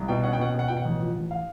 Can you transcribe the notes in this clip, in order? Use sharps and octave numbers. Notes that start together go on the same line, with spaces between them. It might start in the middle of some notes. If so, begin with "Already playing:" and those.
Already playing: C2
B2 G5
C#4 F#5
G5
B2 F#5
G5
B2 F#5
B2 G5
F#5
A1
F3
A1
F5